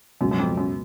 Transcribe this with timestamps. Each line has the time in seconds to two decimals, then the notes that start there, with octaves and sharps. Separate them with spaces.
0.20 C#2 F#2 B2 F#3
0.31 F#2
0.39 F2
0.57 F#2